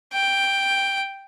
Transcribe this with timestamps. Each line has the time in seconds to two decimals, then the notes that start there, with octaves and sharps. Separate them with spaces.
0.13 G5